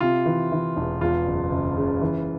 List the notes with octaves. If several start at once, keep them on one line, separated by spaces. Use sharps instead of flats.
C3 F4
E3
E3
E1
E2 F4
F#1
F#1
C#3
E3